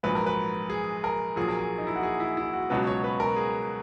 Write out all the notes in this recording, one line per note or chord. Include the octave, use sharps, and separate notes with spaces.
A#1 G#2 F#3 B4
A#4
B4
G#4
A#4
A#1 A#2 F#3 G#4
A#4
G#4
D#4
E4
F#4
G#4
E4
E4
F#4
C#2 B2 F#3 B4
C#5
B4
A#4
G#4